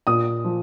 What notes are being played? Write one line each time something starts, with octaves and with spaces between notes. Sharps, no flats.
A#2 D#6
F3